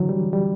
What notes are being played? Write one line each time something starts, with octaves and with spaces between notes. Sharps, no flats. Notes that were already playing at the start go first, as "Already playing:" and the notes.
Already playing: D3 E3 F#3
G3
G3